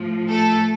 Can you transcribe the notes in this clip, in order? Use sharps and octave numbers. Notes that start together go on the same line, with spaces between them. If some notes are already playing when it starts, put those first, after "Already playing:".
Already playing: A2 F3
A3 A4